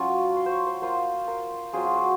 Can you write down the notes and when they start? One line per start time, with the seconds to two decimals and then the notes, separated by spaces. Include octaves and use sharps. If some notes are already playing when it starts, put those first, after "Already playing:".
Already playing: F#3 C#4 F4 C#6
0.36 C6
0.46 C5
0.51 C#5
0.67 C5
0.82 A#3 F4 C5
1.28 A#4
1.73 F#3 C4 F4 G#4
1.84 F4
1.96 F#4